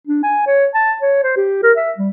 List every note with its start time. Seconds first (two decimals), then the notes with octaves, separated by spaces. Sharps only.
0.07 D4
0.23 G#5
0.47 C#5
0.74 A5
1.02 C#5
1.23 C5
1.37 G4
1.63 A#4
1.77 E5
1.98 G3